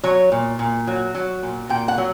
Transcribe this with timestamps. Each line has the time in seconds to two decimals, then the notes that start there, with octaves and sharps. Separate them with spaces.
0.03 F#3 C#5
0.32 A#2
0.59 A#2
0.87 F#3
1.15 F#3
1.42 A#2
1.69 A#2 G5
1.88 F#5
1.98 F#3